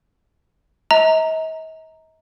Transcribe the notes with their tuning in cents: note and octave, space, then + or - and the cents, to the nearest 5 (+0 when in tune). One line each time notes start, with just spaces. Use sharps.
D#5 +45 A#5 -10